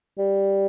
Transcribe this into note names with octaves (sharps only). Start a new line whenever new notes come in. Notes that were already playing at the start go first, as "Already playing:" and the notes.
G3